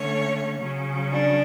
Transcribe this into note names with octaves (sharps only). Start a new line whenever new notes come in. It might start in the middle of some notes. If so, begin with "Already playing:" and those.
Already playing: D3 A3 C#4 C#5
C#3 F#3 C#4
D4